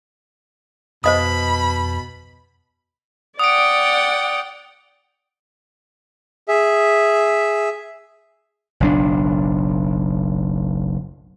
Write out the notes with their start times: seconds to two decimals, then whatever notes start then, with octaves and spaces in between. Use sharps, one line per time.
1.04 F2 B2 C5 D#5 B5 D#6
3.39 D5 F#5 G5 D#6 D7
6.48 G#4 E5
8.80 F#1 B1 D4